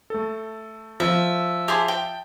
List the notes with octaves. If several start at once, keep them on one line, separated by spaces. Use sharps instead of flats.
A3 A4
F3 E5
G4 G#4 E5 A5 C6 D#6
G5